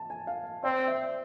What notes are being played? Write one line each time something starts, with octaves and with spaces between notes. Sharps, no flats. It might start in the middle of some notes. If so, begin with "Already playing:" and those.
Already playing: A5
G#5
F5
C4 D5
E5